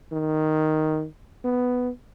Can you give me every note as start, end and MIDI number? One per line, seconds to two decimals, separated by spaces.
0.12 1.05 51
1.44 1.90 59